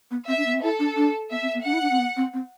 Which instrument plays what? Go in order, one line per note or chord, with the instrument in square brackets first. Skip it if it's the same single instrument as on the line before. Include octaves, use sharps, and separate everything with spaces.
[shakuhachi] B3
[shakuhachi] C4 [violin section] E5
[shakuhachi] D4
B3
C4
[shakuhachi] E4 [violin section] A4
[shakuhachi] D4
D4
[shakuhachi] B3 [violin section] E5
[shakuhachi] C4
B3
[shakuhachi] D4 [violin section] F#5
[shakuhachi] E4
D4
C4
B3
C4
C4